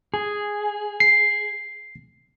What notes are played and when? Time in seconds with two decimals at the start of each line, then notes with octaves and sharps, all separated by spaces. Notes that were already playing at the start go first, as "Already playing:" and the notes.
0.14 G#4
1.00 C7